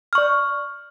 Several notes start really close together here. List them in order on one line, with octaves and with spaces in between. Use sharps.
F6 C#6 D5